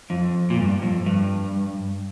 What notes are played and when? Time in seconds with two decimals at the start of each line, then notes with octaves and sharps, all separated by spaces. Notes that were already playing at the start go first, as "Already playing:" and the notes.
0.10 F2
0.50 A#2
0.58 G2
0.82 F2
1.06 G2